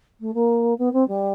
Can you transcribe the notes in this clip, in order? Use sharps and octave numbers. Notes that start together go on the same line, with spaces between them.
A3
A#3
B3
C4
G3